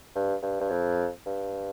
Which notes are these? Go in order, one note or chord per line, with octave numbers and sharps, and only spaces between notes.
G2
G2
G2
F2
G2